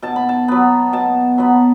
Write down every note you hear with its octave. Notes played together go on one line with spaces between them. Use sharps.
B2 A5
B5
A5
F#3 B3 B5
B2 A5
F#3 B3 B5